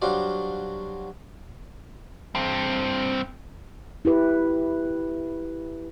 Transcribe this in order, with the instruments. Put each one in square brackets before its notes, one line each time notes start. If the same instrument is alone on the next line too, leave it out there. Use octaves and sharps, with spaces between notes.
[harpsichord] F#3 G3 D4 F#4 C5 F5
[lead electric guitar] G2 C4
[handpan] E4 G4 B4